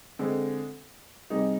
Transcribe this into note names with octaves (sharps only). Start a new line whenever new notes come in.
D3 G#3 C4
C3 G3 C4 D#4 G#4